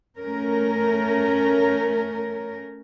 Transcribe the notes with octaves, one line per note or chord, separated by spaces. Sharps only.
A3 C#4 A#4